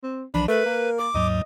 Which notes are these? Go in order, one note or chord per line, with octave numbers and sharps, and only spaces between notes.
C4
B1 E3 F3 D4 B5
A3 A#4 B4
A#3
D6
D#2 G#2 F#3 D#5